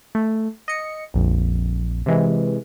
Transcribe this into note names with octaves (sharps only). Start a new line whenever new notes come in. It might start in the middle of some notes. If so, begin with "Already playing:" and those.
A3
D#5 C#7
A#1 F2
C3 E3 G#3